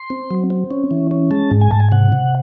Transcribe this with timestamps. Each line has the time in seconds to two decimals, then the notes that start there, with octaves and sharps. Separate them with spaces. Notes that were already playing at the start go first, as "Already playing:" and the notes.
Already playing: C6
0.10 C4
0.31 F#3
0.50 C4
0.71 C#4
0.91 E3
1.11 C#4
1.31 G#3 A5
1.51 G#2
1.61 G#5
1.71 G#2 A5
1.80 G#5
1.92 C3 F#5
2.12 C3